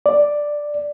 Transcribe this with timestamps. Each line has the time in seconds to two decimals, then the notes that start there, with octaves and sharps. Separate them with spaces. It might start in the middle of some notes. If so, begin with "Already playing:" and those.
0.06 D5